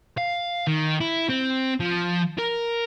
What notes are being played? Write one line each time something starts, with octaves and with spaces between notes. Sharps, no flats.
F5
D#3
E4
C4
F3
A#4